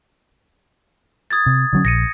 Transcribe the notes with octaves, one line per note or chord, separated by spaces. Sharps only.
D#6 G#6 A6
C3
D3 F#3 C#4
A#1 A#6 C#7 D#7